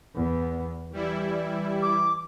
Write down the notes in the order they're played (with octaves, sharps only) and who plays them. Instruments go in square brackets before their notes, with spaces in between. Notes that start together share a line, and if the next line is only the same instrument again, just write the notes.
[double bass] E2 B3
[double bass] E3 [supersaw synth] G3 E4
[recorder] D6